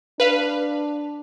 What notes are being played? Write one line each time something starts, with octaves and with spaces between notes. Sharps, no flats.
D4 B4 F5